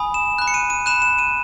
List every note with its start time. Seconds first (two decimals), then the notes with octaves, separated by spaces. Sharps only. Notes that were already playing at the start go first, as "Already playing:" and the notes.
Already playing: G#5 B5 D#6
0.14 E7
0.38 B5 F#6
0.48 C#7
0.54 D#7
0.70 D#7
0.86 B5 F#6 E7
1.02 E7
1.18 D#7